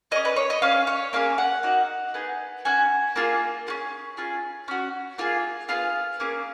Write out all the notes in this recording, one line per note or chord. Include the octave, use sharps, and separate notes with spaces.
C#4 G#4 D#5
B4
C#5
D#5
C#4 G#4 F5
C#5
A#3 C#4 G#4 F5
F#5
A#3 D#4 F#4
B3 D#4 G#4
C#4 F#4 G#5
A#3 F4 G#4
C#4 F4 G#4
C#4 F4 G#4
C#4 F#4
A#3 F4 G#4
B3 F4 G#4 F5
A#3 C#4 G#4